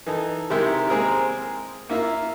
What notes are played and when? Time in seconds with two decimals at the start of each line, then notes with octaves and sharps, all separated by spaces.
0.06 E3 D#4 A4
0.50 C3 D#3 G#3 E4 G4 A#4
0.90 G#3 A#3 C4 G#4 A#4
1.90 A#3 E4 F4 E5